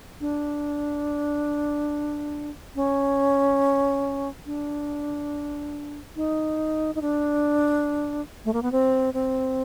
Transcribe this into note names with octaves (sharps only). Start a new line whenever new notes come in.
D4
C#4
D4
D#4
D#4
D4
A3
A#3
B3
C4
C4